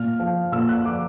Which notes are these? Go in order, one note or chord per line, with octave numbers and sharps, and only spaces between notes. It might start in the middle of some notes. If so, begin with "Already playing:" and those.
Already playing: A#2 F6
F3
A#2 E6
F#6
F3 D6